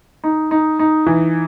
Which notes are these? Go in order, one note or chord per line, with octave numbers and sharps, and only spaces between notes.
D#4
D#4
D#4
E3